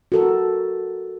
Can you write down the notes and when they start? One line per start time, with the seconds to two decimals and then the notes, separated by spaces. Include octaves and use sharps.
0.12 F#4 A4 A#4